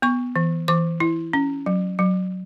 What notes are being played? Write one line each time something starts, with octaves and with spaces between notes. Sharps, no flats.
B3 C#6
E3
E3 D6
E4
C#4
F#3
F#3